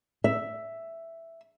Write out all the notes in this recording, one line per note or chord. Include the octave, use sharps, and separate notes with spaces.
E5